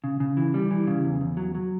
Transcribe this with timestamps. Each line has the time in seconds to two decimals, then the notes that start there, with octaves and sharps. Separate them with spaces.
0.04 C#3
0.20 C#3
0.37 E3
0.54 G3
0.71 E3
0.87 C#3
1.05 E2
1.21 E2
1.37 F#3
1.55 F#3